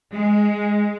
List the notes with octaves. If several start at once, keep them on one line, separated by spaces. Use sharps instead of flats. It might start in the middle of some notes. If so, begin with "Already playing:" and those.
G#3